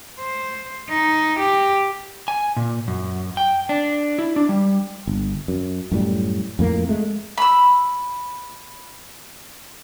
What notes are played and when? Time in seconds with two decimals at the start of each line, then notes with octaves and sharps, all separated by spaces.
0.20 C5
0.90 D#4
1.39 G4
2.28 G#5
2.56 A#2
2.88 F#2
3.37 G5
3.69 D4
4.19 E4
4.36 D4
4.49 G3
5.07 G1
5.48 F#2
5.92 F#2 A2 G3
6.59 F2 A2 A#3
6.89 G#3 A3
7.38 B5 E6